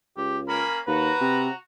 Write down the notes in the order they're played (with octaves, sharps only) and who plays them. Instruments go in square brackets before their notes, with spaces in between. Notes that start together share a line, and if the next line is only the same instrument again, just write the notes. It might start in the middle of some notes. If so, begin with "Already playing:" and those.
[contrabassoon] C#2 [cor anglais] G4
[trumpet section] A#3 C#4 B5 [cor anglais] A#4
[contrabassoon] D#2 [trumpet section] F#4 A#5 [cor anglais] B4
[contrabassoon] C3